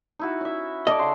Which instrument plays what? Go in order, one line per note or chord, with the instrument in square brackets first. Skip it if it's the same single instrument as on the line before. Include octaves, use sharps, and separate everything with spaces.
[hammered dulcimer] D#4 E4 F#4
C#4 E5
[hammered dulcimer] A4 D5 [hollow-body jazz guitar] D#5
[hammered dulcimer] C#3 G5 C6